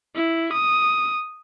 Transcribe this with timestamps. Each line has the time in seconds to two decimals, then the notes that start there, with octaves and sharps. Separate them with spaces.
0.15 E4
0.53 D#6